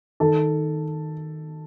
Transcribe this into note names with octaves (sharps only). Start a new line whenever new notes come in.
D#3 A4